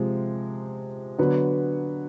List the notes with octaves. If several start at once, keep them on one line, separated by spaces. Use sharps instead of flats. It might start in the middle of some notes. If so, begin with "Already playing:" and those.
Already playing: C3 F3 G#3
D3 F#3 B3